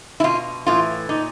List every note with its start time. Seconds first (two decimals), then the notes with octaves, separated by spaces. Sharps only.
0.20 E4
0.24 B2 F4
0.66 A2 E3 F4
1.09 A#2 D#4